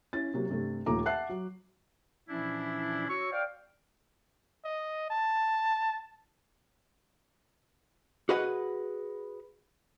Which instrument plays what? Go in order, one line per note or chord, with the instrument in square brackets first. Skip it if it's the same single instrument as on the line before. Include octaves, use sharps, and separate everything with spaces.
[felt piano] C#4 E4 A6
C3 F#3 A#3
G2 C3 A3
D#1 D#2 F3 A3 A#5 D6
E5 F#5 A5 F#6 C7
F#3
[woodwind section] A#2 E3 F3 C#4 D4 E4
F#4 C#5 C#6 E6
C5 D5 F5 G5
[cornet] D#5
A5
[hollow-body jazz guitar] F#4 G#4 B4 D#5 F#5